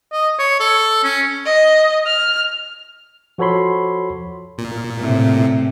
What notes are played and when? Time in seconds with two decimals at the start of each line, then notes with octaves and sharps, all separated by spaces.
0.12 D#5
0.39 C#5
0.60 A4
1.04 C#4
1.46 D#5
2.06 F6
3.38 F3 F#4 A4 C#5 B5 C6
4.58 A#2
4.98 A2 C3